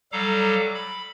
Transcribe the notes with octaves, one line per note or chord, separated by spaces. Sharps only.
F#3 G3 A4 F5 A#5 D6
B5